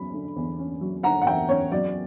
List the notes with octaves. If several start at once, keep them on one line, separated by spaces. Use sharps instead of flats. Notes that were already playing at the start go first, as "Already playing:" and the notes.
Already playing: E2 F#3 C#4 B5
D3
E2
C#4
F#3
D3 F#5 A#5
F#5
E2 E5 G5
C#4 C#5
F#3 D5